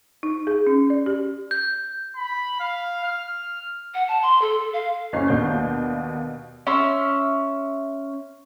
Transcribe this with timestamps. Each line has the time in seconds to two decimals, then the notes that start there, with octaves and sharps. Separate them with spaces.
0.23 D#4
0.47 G#4
0.67 C#4
0.90 D5
1.06 G4
1.51 G6
2.16 B5
2.60 F5
3.04 F6
3.94 F#5
4.08 A5
4.22 C6
4.42 A4
4.73 F5
5.13 F#1 C#4 C7
5.28 D#2 B2 A#3 D4 G6
6.67 C#4 E5 C6